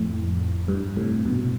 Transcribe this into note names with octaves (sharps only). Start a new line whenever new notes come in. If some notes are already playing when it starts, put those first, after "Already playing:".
Already playing: F2 A2
G2
A2 C3
G2 B2
B2